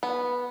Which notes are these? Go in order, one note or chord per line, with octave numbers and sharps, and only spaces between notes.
B3